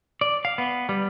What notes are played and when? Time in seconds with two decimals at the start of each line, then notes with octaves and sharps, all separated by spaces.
0.21 D5
0.45 F5
0.58 B3
0.89 G3